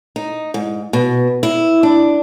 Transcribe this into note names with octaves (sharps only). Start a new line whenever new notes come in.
D#4
G#2
B2
E4
D4